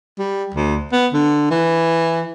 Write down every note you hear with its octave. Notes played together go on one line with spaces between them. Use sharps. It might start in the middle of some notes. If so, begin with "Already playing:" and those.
G3
D2
B3
D3
E3